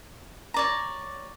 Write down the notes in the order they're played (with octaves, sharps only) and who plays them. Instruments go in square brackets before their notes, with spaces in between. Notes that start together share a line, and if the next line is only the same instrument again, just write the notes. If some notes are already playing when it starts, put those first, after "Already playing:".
[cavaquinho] C#5 D5 A#5